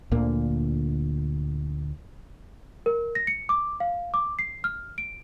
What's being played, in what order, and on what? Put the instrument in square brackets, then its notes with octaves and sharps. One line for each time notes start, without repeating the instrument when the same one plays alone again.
[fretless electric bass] D2 A#2 D3 A#3
[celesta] A#4
A#6
C#7
D6
F5
D6
C7
F6
D7